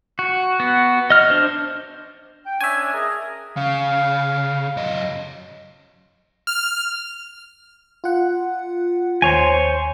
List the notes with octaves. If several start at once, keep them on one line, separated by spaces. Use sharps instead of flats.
F#4
B3 F#4
D#5 F6
D4 C5
G5
C#4 D4 E5 G#5
G#4 A#4 D#5
C#3 F5
F#2 D#5
F6
F4 F#5
D#2 C5 C#5 G#5